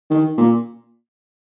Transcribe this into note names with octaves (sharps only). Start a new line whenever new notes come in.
D#3
A#2